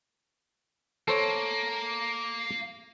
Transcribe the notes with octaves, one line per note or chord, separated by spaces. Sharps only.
A#3 A4 C5 C#5